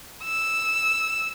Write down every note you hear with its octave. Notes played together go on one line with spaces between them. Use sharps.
E6